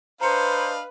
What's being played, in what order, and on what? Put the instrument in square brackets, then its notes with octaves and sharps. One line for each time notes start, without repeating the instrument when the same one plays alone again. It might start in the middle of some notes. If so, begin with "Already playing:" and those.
[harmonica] D4 D#5 F5 [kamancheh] B4 [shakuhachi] C5 [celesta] A#5 C#7